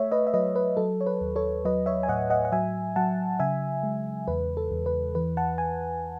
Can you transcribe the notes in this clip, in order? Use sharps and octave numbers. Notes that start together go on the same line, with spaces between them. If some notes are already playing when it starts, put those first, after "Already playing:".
Already playing: A3 C#5 E5
B4 D#5
E5
F#3 B4 D#5
B4
F#3 A4
C#5
B4
D#2
A4 C#5
F#3 B4 D#5
C#5 E5
G#5
A2 D#5 F#5
D#5 F#5
F#5
F#3 E5 G#5
F#3 F#5 A5
C#3 E5 G#5
G#3
E2 B4
A4
E2
B4
E3 B4
F#5 A5
G#5